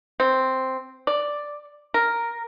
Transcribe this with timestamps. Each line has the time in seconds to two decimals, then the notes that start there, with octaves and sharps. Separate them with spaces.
0.20 C4
1.07 D5
1.94 A#4